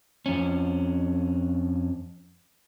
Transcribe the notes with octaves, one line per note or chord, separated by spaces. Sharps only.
F2 C#4